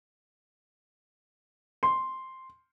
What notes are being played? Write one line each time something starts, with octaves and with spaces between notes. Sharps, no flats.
C6